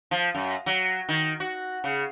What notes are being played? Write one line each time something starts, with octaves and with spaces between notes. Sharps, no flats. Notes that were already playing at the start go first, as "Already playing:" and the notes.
F3
F#2
F#3
D#3
F#4
C#3